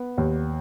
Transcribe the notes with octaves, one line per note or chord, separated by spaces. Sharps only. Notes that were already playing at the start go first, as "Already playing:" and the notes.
Already playing: B3
D#2